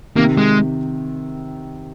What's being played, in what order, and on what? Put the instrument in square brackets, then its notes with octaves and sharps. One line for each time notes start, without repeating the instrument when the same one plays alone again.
[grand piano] C3 D#3 [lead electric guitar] A#3
[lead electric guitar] G#3